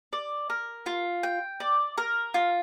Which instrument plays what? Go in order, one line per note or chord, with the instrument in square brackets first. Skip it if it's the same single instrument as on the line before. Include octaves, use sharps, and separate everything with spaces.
[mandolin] D5
A#4
F4
G5
D5
A#4
F4